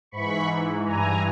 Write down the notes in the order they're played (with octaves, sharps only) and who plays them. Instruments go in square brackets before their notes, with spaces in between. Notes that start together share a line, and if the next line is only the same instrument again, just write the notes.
[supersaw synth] G#2 E3 B5 C#6
G2 E3 G#5 A#5